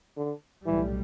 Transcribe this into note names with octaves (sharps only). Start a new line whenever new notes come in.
D3
B1 A2 E3 G3